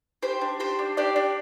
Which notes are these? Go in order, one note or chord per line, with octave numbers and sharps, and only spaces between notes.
G4 C5
D4
G4 C5
D4
D4 G4 D5
D4